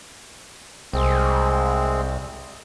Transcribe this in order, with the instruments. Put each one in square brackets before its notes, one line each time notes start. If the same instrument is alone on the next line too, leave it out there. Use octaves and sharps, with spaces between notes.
[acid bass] C2 [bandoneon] G#3 C4